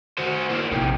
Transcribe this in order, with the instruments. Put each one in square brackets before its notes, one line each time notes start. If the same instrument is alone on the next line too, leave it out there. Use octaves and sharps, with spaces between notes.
[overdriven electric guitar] F#4 C5
A#3 E4
[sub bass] A#1 [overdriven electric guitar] C3 D#3